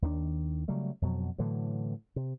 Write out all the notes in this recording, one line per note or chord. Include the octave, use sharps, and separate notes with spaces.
D#2 D#3 F#3 D4
C#3 F#3 G3 A3
F2 B2 F#3
A2 D3 E3 F#3
C3